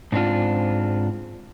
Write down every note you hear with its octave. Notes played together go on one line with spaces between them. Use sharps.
G#2 C4 D4 F4